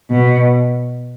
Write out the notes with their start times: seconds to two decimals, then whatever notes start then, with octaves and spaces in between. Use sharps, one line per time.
0.11 B2